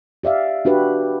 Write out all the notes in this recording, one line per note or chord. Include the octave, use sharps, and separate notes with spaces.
G4 D5 E5 F5
D4 F#4 G4 B4